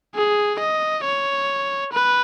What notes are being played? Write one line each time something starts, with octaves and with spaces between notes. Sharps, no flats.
G#4
D#5
C#5
B4